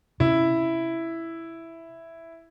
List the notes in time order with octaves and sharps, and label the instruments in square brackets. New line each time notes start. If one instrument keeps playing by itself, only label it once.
[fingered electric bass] C3 C#4 [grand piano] E4